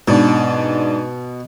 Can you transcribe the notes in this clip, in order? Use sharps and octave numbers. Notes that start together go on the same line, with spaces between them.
G#2 B2 D4